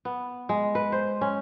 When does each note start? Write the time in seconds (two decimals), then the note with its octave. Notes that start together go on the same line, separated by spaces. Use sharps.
0.05 B3
0.49 G#3
0.75 B4
0.92 C5
1.21 C#4